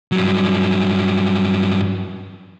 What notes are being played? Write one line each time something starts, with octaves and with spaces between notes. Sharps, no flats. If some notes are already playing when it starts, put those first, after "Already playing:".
G2 F#3